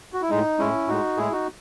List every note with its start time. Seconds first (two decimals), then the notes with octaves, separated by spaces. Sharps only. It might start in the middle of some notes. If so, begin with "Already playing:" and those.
0.13 F#4
0.22 E4
0.30 A2 G#3 D#4
0.59 A2 G#3 C#4 E4
0.88 A2 G#3 D#4 F#4
1.17 A2 G#3 E4 G#4
1.32 D#4 F#4